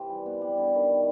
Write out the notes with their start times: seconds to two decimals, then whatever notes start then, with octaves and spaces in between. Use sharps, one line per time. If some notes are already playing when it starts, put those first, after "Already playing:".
Already playing: C3 E3 C4
0.09 G3
0.26 B3
0.41 G3
0.57 D3
0.74 D#3
0.89 D#3